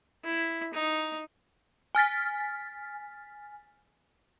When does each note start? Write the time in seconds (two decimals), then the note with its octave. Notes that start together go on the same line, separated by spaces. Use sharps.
0.24 E4
0.74 D#4
1.95 G#5 F6 A6 B6